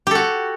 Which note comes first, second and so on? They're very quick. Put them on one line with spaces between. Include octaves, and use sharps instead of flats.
G4 A4 F#4